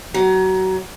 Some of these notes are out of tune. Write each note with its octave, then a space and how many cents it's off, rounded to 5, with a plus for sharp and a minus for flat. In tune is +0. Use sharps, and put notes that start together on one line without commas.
F#3 +25